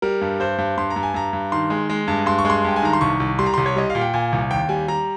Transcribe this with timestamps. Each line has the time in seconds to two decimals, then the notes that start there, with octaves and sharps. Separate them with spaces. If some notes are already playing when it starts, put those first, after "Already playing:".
0.02 G3 A#4
0.21 G2
0.40 G2 C5
0.58 G2
0.77 G2 C6
0.90 A#5
0.96 G2
1.03 G#5
1.14 G2 A#5
1.33 G2
1.52 D#3 C6
1.70 G#3
1.89 G#3
2.08 G2
2.26 G2 C6
2.39 C#6
2.45 G#3
2.50 C6
2.64 G2 G5
2.76 G#5
2.83 D#3 A#5
2.93 C6
3.01 C2 C#6
3.20 C2
3.39 G3 C6
3.46 A#5
3.54 C2 C6
3.66 C#5
3.76 G3 D#5
3.90 F5
3.95 A#2
4.01 G5
4.14 A#2 G#5
4.32 C2
4.50 D#2 G5
4.69 G3 G#5
4.88 G3 A#5